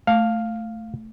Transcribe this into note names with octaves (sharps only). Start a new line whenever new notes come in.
A3 F5